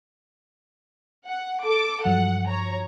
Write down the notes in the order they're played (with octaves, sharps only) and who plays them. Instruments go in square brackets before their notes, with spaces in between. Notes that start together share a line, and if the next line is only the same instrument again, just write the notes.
[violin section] F#5
A4 D6
[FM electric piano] G2 F3 F#3 [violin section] F#5
[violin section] C#5 A#5